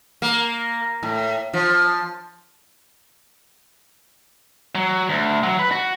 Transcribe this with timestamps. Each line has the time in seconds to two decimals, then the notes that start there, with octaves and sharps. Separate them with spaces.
0.22 A#3
1.03 A2
1.53 F3
4.75 F#3
5.09 D2
5.43 F#3
5.59 B4
5.72 F#4